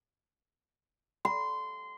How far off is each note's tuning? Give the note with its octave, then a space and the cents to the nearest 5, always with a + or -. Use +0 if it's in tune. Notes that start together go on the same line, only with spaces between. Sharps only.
C6 -20